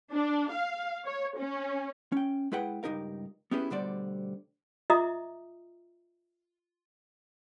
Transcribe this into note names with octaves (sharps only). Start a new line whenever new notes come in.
D4
F5
C#5
C#4
C#4 G5
G#3 E4 G#4 B4 F#5 G5
C#2 G2 D#4 G4 A#4 F5
B3 C#4 E4 G4 G#4 B4
D2 B2 D3 G3 C5 D5
F4 D#5 E5 A#5 D6 D#6